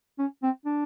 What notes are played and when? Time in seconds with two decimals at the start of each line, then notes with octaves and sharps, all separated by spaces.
0.19 C#4
0.43 C4
0.65 D4